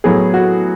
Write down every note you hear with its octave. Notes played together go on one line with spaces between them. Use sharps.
A2 F#3 B3 G#4
F#4